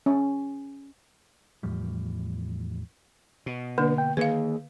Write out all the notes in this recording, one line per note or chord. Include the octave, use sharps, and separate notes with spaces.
C#4
E2 A2 F3 G3
B2
D3 A#3 D4 B4
G5
D#3 A#3 G#4 B4 F5